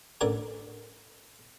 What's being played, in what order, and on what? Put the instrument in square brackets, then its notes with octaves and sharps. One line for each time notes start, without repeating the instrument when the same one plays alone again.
[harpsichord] A1 D3 A#4 D5 G#5